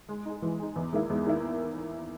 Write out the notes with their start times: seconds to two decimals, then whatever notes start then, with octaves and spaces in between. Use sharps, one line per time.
0.09 G#3
0.25 D#4 G#4
0.42 E3 G#3
0.59 D#4 G#4
0.76 E2 E3
0.93 D#3 G#3 A#3 E4
1.10 E2 G#3
1.27 D#3 A#3 E4